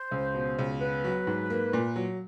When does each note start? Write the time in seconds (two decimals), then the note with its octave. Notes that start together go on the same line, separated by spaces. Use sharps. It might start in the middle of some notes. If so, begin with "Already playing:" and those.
Already playing: C5
0.11 C#2
0.34 B2
0.59 C#2
0.81 B3 B4
1.04 F#3
1.27 G#2
1.50 A#3
1.73 A#2
1.96 F#3